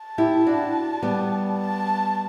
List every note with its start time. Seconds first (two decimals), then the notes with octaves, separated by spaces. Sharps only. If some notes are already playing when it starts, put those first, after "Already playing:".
Already playing: A5
0.18 E4 G4
0.46 D4 F#4
1.02 G3 B3
1.60 A5